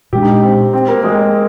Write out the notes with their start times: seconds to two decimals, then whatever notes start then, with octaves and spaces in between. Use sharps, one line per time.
0.13 A#2 G#3 D4 G4
0.23 D#4
0.43 C4
0.73 C4
0.88 A#3
1.04 G#3